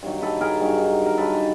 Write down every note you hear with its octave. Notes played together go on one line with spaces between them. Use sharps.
G2 D#3 F#3
A4 B4
G#4 A#4
G2 D#3 F#3
A#4
G2 D#3 F#3 A4 B4